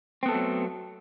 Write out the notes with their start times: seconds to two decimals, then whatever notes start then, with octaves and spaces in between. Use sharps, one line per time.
0.23 C4
0.26 B3
0.29 A4
0.31 A3
0.34 F#3